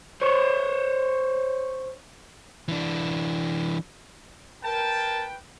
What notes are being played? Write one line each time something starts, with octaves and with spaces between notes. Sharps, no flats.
C5 C#5
E3 D4
A#4 B4 G5 A5